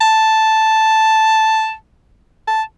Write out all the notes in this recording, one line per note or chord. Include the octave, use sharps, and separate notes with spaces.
A5
A5